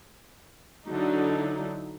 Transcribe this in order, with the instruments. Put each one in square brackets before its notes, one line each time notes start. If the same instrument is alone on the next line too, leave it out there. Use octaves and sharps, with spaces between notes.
[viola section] D3 F#3 D#4 E4